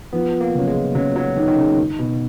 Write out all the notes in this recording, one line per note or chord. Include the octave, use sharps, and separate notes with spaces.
F3 B3
A#3
C#3 F#3
G#3
C#3 F#3
F#3
D#3 A#3
D#3
C#3
D#3
B2